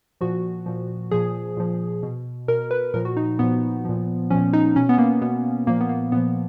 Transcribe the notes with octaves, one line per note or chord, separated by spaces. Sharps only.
A#2 F3 F#4
A#2 F3
A#2 F3 G#4
A#2 F3
B2
B2 A#4
B4
A#2 F3 A#4
F#4
D#4
A#2 F3 B3
A#2 F3
A#2 F3 C#4
D#4
B2 C#4
B3
A#3
B2 B3
A#2 F3 A#3
B3
A#3
A#2 F3 B3